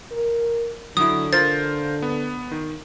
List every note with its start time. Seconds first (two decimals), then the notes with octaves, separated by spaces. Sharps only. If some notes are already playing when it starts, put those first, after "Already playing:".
0.12 A#4
0.97 D3 F#3 E4 D#6
1.33 F4 A#4 C5 A6
2.02 B3
2.51 D#3